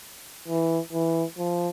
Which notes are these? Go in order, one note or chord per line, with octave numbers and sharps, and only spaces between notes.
E3
E3
F3